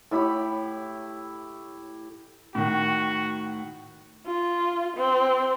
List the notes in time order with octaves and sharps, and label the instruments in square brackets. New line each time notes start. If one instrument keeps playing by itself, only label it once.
[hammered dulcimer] A2 E4 G4 B5
[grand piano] A2 D#3 [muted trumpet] F#4
[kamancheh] F4
C4